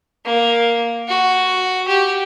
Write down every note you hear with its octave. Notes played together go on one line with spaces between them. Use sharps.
A#3
F#4
G4